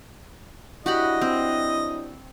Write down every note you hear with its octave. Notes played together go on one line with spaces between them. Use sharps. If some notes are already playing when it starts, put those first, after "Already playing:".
F#3 D4 E4 F#4 G4 D#5 B5
C4